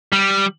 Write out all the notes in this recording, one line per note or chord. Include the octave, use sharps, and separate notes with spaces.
G3